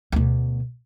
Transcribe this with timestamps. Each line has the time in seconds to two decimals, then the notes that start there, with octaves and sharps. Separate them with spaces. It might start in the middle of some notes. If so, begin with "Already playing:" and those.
0.12 D2 B2